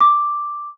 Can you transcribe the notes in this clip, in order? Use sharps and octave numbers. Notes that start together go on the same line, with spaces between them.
D6